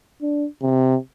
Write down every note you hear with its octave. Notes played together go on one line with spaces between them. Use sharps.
D4
C3